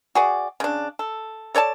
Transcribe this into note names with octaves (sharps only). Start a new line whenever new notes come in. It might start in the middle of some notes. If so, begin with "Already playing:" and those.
F#4 G#4 D5
C#3 D4
A4
A4 C#5 D5 A5